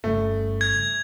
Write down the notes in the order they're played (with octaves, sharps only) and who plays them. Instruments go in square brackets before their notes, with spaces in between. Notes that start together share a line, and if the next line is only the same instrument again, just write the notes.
[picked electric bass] G1 G2 C#3 [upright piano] A3
[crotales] G#6